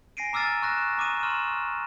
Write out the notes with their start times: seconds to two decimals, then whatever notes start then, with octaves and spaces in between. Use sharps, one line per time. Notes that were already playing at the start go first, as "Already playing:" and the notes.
0.17 G#5 A#6 C7 D7 D#7
0.33 A#5 D6 E6 F6 A6 D#7
0.62 C#6 F#6 A#6 E7
0.98 A#5 D6 D#6 D#7
1.23 C6 C#6 F6 E7